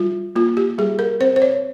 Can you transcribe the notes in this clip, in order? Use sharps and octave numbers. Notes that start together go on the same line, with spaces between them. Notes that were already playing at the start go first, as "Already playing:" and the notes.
Already playing: G3 F4
A#3 F4
G4
G3 G#4
A#4
C4 C5
C5
C#5